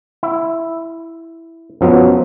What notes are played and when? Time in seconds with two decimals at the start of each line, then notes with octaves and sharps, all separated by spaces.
0.23 E4
1.81 F#2 F3 F#3 B3